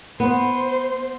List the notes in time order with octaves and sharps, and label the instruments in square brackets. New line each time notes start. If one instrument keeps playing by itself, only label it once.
[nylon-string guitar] B3 [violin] C5